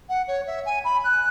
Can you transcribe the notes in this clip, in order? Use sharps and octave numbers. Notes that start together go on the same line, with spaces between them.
F#5
C#5
E5
G#5
B5
F#6